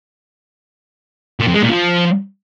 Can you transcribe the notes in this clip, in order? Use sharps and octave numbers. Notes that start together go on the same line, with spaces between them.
A#2
F2
G#3
A#2
F3